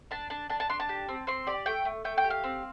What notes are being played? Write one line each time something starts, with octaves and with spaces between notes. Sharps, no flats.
D4 A5
D4 A5
D4 A5
A5
D4 C6
A5
G4
C4
C4 C6
G4 D5
A3 G5
A3
A3 G5
G5
G4
F5
C4